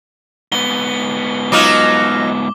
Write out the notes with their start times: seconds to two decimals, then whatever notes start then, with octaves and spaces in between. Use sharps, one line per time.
0.52 G#2 B3 G7
1.52 F#3 D#4 F4 D6